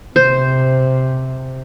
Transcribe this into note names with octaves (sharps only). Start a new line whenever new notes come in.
C3 C5